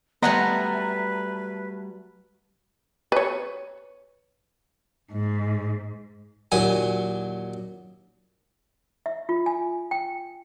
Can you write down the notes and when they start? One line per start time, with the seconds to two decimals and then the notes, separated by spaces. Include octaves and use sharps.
0.22 F#3 G3 A3 B3 B4 D#5 F#5 A#5
3.12 B4 C#5
5.12 G#2
6.52 D#2 A#2 F#3 G#5
9.06 E5
9.29 F4
9.46 G#5
9.91 G5